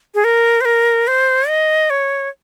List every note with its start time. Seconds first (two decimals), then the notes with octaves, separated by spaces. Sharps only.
0.14 G#4
0.24 A#4
0.61 C5
0.65 A#4
1.07 C5
1.48 D#5
1.90 C#5